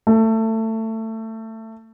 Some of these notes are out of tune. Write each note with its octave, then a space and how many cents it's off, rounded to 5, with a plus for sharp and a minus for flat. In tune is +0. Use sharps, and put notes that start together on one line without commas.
A3 +20